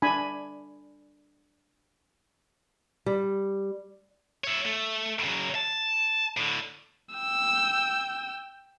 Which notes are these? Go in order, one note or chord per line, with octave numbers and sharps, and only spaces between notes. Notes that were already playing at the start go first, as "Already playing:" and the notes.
D4 G#5 B5
G3
C#5 E5
A3
C#3 F#3
A5
A2 D3
G5 E6